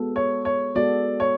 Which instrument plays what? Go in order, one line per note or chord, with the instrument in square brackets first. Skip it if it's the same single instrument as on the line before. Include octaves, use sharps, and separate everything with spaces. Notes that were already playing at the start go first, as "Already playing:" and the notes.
Already playing: [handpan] G#3 B3 F#4 A4
[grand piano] C#5
C#5
[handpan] G#3 B3 F#4 A4 [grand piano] D5
[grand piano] C#5